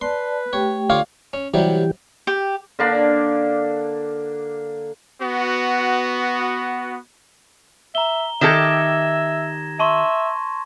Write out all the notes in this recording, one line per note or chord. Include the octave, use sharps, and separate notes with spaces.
B4 D5 A5 C6
A3 G4 C#5 G5
D3 F4 C#5 D5 F5
C#4
C3 E3 F#3 G3 G4
G4
D3 A#3 D4
B3 F#4
E5 A#5 G7
D#3 G4 A4 E5 G#6 A#6 E7
E5 A5 C6 C#6